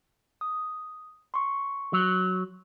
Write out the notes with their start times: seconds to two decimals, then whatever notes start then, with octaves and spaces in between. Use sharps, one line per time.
0.41 D#6
1.34 C6 C#6
1.93 F#3